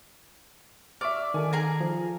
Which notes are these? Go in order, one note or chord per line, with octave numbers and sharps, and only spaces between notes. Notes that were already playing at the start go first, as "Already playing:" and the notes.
D5 E5 C#6 F6
D#3 A4 G#5
G#4 A#4 A#5
F3